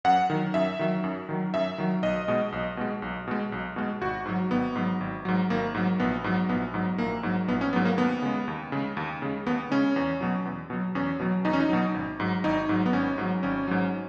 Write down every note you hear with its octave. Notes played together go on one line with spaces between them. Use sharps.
F#2 F#5
D#3 F#3
F#2 E5
D#3 F#3
F#2
D#3 F#3
F#2 E5
D#3 F#3
B1 D#5
B2 G#3
B1
B2 G#3
B1
B2 G#3
B1
B2 G#3
G#1 F#4
G#2 F#3
G#1 B3
G#2 F#3
G#1
G#2 F#3
G#1 A#3
G#2 F#3
A#1 B3
G#2 F#3
A#1 B3
G#2 F#3
A#1 A#3
G#2 F#3
A#1 B3
C#4
G#2 F#3 B3
A#3
D#2 B3
C#3 G#3
D#2
C#3 G#3
D#2
C#3 G#3
D#2 B3
C#3 G#3 C#4
E2
B2 F#3
E2
B2 F#3
E2 C#4
B2 F#3
E2 D#4
C#4
D#4
B2 F#3
G#1
G#2 F#3
G#1 D#4
G#2 F#3
B3
G#1 C#4
G#2 F#3
G#1 C#4
G#2 F#3